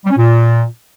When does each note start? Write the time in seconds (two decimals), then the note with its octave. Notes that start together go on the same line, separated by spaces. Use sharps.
0.05 G3
0.10 C#4
0.16 A#2